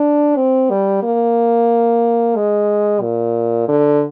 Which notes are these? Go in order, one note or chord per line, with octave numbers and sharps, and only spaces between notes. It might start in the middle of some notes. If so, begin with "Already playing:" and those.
Already playing: D4
C4
G3
A#3
G#3
A#2
D3